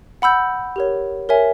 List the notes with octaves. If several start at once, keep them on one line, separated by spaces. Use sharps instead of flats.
F#5 B5 E6 G6
G4 A#4 C#5
A#4 C#5 E5 G#5